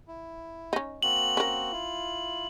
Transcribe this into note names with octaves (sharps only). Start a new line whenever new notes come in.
E4
C#4 D#4
A#3 C4 F#4 F#7
C#4 A#4
E4 F4